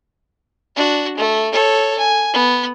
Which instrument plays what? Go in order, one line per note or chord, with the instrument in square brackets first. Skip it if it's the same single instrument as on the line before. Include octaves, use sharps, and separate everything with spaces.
[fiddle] D4 F#4
A3
A4 C#5
G#5
B3